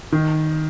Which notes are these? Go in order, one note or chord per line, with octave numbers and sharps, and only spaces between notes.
D#3